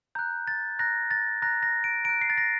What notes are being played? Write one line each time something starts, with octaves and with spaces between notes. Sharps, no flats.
A#5 F#6 G6
A6
A#5 F#6 A#6
A6
A#5 F#6 A#6
A#6
D7
A#5 F#6 D7
C7
A6
A#6